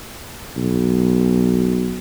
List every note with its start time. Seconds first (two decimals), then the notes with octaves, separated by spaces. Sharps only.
0.57 B1